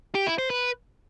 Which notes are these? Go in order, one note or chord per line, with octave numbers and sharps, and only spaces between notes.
G4
E4
C5
B4